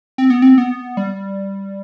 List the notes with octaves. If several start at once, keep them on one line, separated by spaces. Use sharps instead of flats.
C4
B3
C4
B3
G3